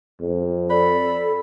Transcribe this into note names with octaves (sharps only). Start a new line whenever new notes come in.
F2
A4 D5 B5